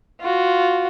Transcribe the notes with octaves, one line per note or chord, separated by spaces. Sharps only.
F4 F#4